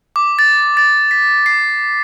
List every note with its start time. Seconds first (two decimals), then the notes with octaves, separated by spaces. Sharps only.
0.16 D6
0.39 A6
0.77 A6
1.11 B6
1.46 C7